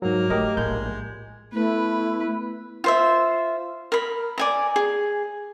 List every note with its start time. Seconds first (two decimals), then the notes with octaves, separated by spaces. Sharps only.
0.02 G#2 F#3 A#3
0.30 G#2 A3 G4 A#4 D#5
0.57 A#1 A2 G#3 G6
1.53 A3 B3 E4 B4
2.84 F4 C5 E5
3.92 A#4 B5
4.38 D5 G#5 A#5
4.76 G#4